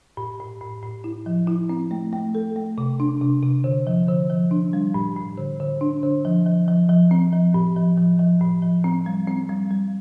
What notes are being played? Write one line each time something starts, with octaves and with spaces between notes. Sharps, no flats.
A2
A2
A2
A2
E4
F3
E4
C4
A3
A3
A4
A3
C3
D4
C3
C3
D3
F3
D3
F3
D4
G3
A2
A2
D3
D3
D4
D3
F3
F3
F3
F3
C4
F3
A2
F3
F3
F3
A2
F3
C4
G3
C4
G3
G3